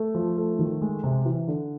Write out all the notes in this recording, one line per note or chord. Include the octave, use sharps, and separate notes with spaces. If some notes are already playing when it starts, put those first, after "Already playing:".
Already playing: A3
F3
A3
D#3
G#3
C3
E3
D3